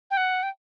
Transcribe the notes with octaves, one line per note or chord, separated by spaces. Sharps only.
G5
F#5
G5